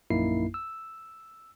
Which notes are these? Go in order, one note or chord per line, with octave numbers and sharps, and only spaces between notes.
A#1 F#2 A#3 D#4 E4 C7
E6